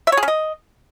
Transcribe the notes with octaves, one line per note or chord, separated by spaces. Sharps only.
E5
C#5
G#4
C#4
D#5